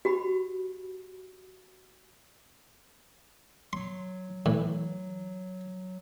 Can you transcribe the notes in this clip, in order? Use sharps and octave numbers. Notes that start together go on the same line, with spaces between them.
F#4 G4 B5
F#3 C6
A2 E3